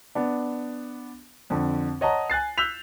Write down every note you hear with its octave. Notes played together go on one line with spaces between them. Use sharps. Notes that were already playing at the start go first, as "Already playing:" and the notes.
B3 D4
F2 D3
C#5 D#5 F#5 A5 A#5
G#5 F#6 A6 C7
E6 F#6 G6 B6 F7